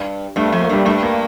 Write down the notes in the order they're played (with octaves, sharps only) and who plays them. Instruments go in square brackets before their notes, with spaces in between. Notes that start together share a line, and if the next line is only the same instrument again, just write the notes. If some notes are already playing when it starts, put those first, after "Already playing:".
Already playing: [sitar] G2
[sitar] G2 [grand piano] A3
[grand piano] A3
[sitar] F2
[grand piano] A#3
[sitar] G2 [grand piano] G3
[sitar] G2 [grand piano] A3
[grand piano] A#3